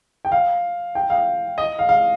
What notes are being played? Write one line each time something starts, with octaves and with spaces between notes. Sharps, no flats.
G5
F5
G5
F5
D#5
F5
F5